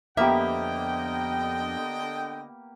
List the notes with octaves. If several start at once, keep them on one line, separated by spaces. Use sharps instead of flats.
F2 D3 A#3 B3 G4 D#5 E5 G5